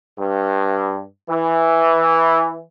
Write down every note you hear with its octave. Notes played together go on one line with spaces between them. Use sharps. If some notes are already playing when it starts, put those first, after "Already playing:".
G2
E3